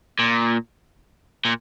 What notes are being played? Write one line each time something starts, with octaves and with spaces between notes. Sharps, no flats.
A#2
A#2